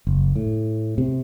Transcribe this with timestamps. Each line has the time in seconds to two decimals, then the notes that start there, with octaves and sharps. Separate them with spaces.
0.07 F#1
0.36 A2
0.98 C3